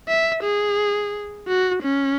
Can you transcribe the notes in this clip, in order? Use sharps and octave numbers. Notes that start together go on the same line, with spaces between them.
E5
G#4
F#4
C#4